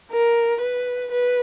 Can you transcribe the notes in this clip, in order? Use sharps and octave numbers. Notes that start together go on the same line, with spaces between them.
A#4
B4
B4